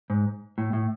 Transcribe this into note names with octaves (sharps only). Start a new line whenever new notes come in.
G#2
A2
A2